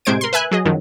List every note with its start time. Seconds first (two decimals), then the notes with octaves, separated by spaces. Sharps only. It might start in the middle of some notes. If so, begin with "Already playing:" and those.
0.05 A2 C3 G#3 C5 G#6 D7
0.21 A#4 C6
0.33 B4 E5 G#5 F#6
0.51 F#3 G#4 D#5
0.65 F#2 D#3 F3 F#3